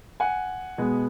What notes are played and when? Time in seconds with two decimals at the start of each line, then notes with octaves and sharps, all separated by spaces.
0.20 F#5 G#5
0.78 B2 G#3 B3